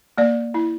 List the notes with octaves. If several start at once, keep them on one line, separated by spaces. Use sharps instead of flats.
A#3 D5
E4